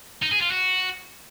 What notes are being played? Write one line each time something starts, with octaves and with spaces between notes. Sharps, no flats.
D#4
G#4
F4
F#4